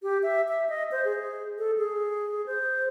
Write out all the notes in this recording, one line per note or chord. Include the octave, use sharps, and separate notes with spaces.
G4
E5
E5
D#5
C5
G#4
A4
G#4
C5